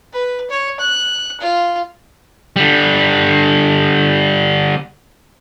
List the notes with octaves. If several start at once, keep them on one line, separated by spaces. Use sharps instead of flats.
B4
C#5
F#6
F4
D3 G3